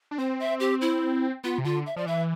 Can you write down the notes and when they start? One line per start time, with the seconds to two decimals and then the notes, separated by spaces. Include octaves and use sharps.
0.11 D4
0.18 C4 C5
0.39 E5
0.60 G4
0.81 E4
1.44 B3 F4
1.58 C3
1.65 D3 F4
1.86 E5
1.96 F3 D5
2.06 E3 E5